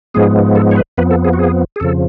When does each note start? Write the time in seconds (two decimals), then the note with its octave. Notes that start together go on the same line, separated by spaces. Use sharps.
0.14 G#2 F3 G#3 B3 G#4
0.55 A4
0.71 C#5
0.76 B4
0.98 F2 F3 B3 B4
1.11 A4
1.24 G#4
1.33 F#4
1.39 G#4
1.76 G#4
1.80 F2 C#3 F3 A4